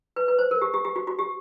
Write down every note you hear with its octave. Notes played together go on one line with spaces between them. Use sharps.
B4
B4
C5
A#4
G4
G4
G4
F#4
F#4
G4